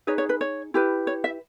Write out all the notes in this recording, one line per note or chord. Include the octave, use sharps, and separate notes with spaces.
D#4 G#4 B4 C#5
C#5
B4
C#5
E4 G4 B4
C#5
E5